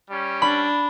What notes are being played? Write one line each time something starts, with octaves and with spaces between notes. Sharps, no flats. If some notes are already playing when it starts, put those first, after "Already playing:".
G3 C#4
D4 B5